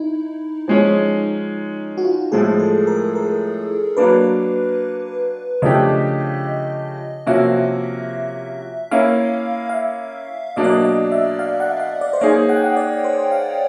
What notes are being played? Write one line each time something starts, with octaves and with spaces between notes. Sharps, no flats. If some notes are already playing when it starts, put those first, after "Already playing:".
Already playing: D#4 E4
F3 G#3 C#4
F#4
F4
A2 F3 G#3 G#4
A4
A#4
A#4
F#3 A#3 D4 B4
C#3 F3 A3 D4 G4 D#5
C3 F3 A#3 C#4 F#4 E5
A#3 C#4 E4 F5
F5
E5
B2 F#3 A#3 D4 D#5
D5
D#5
D#5
E5
F5
F#5
F5
D5
C5
A#3 D#4 G#4 C#5
F#5
G5
F#5
D5
C5
F5